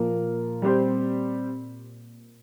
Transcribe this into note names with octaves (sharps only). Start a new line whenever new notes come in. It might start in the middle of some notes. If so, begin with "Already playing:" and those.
Already playing: A#2 F3 A#3 F4 A#4
G3 C4 G4 C5